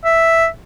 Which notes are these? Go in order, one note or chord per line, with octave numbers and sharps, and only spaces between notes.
E5